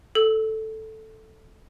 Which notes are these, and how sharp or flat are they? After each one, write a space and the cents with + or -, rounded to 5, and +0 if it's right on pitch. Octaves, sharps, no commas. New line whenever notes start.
A4 +0 E6 -30